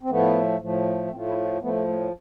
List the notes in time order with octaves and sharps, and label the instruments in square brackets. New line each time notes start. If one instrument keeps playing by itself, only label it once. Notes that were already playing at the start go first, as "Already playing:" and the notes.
[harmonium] C4
A2 F3 A3 B3
A2 F3 A3
A2 F3 A3 C4
E4
F4
A2 F3 A3 B3
A3